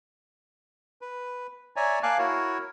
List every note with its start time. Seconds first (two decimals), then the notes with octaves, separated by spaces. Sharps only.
1.01 B4
1.76 C#5 D5 E5 G#5 A#5
2.03 A#3 F5 G#5 A5 D6 F#6
2.19 E4 F#4 A#4 C#5